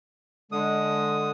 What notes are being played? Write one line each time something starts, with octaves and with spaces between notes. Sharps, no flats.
D3 G#3 D#6